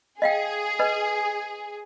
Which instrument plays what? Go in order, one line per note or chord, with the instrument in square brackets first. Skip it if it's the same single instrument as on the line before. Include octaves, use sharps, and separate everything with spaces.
[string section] G#4 [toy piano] D#5 F5 G5
[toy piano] B4 D#5